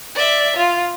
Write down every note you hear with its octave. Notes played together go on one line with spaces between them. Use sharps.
D5 E5
F4